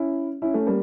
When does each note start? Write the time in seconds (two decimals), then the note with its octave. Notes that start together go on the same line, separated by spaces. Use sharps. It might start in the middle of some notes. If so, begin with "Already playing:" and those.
Already playing: C#4 E4
0.42 C#4 E4
0.54 A3 C#4
0.67 G3 A#3